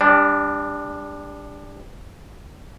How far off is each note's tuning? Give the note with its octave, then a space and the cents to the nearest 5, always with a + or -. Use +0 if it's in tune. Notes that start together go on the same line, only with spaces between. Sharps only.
G3 +30 D4 -5